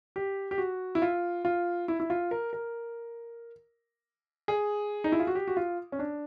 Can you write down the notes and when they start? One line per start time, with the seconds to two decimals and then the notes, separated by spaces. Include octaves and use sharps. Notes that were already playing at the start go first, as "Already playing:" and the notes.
0.16 G4
0.51 G4
0.58 F#4
0.95 E4
1.02 F4
1.45 F4
1.88 E4
2.00 E4
2.10 F4
2.31 A#4
2.53 A#4
4.48 G#4
5.04 D#4
5.12 E4
5.20 F4
5.27 F#4
5.35 G4
5.47 F#4
5.57 F4
5.92 C#4
5.99 D4